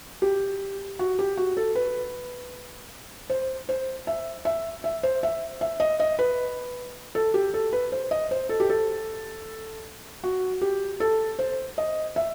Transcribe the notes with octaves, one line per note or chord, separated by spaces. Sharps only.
G4
F#4
G4
F#4
A4
B4
C5
C5
E5
E5
E5
C5
E5
E5
D#5
D#5
B4
A4
G4
A4
B4
C5
D#5
C5
A4
G4
A4
F#4
G4
A4
C5
D#5
E5